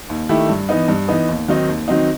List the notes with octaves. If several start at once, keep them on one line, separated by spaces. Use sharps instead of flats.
D#2
D#3 A3 E4 G4
G2
E3 B3 D#4
G2
E3 B3 D#4
D#2
D#3 F#3 C4 D#4
D#2
D#3 F#3 C4 D#4